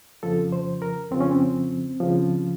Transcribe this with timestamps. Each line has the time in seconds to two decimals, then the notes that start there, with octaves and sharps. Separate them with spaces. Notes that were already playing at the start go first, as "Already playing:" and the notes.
0.23 F2 C#3 F3 A4
0.52 C5
0.82 A#4
1.11 F2 C#3 F3 C4
1.20 C#4
1.31 C4
2.00 C#2 C#3 F3